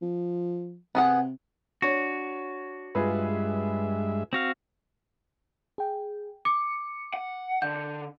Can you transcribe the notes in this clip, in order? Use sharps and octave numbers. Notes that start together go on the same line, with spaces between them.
F3
C3 B3 G#4 F#5
D4 F#4 C#5
G2 G#3 F4 G#4 B4 E5
C4 F#4 F5
G#4 G5
D6 C#7
F#5
D3 G6